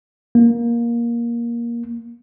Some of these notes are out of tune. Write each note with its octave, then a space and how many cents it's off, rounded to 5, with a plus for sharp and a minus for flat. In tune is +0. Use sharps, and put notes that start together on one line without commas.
A#3 +15